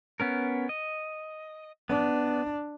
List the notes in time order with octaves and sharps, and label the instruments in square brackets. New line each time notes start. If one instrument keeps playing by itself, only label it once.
[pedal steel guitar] B3 C#4 A#4
D#5
[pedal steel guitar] B3 [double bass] D4